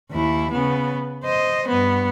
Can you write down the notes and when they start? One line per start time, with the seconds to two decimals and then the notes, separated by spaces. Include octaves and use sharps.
0.11 D#2 E4
0.51 C#3 B3
1.24 C5 D#5
1.68 G2 B3